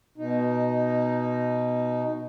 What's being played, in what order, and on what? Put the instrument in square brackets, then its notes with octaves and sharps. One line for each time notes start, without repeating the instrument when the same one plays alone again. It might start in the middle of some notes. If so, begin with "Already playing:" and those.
[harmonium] B2 D#4